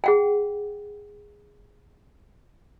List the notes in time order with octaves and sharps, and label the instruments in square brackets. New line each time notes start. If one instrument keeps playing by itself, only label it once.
[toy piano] G#4 F#5 G5